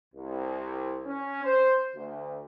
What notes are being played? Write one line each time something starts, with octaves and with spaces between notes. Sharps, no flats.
C2
C#4
C5
D2